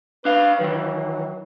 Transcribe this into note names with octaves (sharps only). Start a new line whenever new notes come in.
D4 B4 F5
D#3 E3 F#3